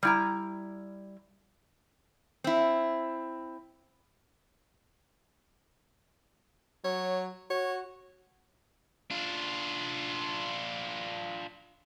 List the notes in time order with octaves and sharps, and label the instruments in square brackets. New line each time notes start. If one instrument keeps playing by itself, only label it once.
[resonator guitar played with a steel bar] G3 E4 A#5
C4 E4
[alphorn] F#3 [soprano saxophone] C#5
[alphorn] F#4 [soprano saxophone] C#5
[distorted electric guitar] D4 F4